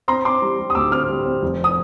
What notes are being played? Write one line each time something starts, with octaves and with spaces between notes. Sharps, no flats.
C4 A#5 C6
C4 C6 D6
G3
G3
D#6
D2 D6 E6
C4 D#6 F6
G3
C4
F1
D#6